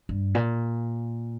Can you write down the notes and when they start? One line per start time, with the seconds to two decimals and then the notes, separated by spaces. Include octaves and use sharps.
0.09 G2
0.35 A#2